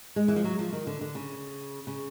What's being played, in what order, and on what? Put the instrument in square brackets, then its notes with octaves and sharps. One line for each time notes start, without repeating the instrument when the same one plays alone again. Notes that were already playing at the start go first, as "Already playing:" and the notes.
[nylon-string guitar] G#3
E3
F3
F#3
F3
D#3
D3
D3
C#3
C#3